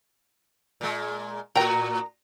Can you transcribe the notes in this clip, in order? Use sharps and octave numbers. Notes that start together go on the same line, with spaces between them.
A#2 G#3
A2 F#4 A#4 G5 A#5